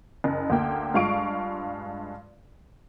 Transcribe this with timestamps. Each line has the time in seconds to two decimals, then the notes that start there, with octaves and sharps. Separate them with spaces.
0.24 F#1
0.50 D2 A#3 G5
0.94 G2 G#3 F4 F5 C#6 D7